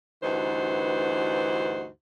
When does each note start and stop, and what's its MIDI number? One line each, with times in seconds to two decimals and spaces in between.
0.23 1.88 38
0.23 1.88 43
0.23 1.88 52
0.23 1.88 63
0.23 1.88 66
0.23 1.88 72